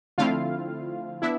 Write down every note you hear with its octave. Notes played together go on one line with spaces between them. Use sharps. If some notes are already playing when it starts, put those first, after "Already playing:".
D3 F3 A3 C4 E4 F4 F5
B3 D4 E4 E5